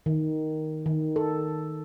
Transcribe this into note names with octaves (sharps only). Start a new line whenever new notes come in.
D#3
D#3
A4